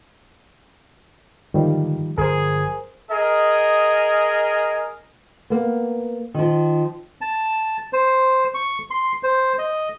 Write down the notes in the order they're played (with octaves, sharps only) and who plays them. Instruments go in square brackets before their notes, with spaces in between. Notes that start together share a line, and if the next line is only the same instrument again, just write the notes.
[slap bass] G#2 D3 [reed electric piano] D#3 F3 G3
[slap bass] G1 F3 F#3 [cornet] G#4 [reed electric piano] A#4 C5
[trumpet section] G#4 A#4 D#5
[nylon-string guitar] A#3 B3
D#3 F3
[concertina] A5
C5
C#6
C6
C5
D#5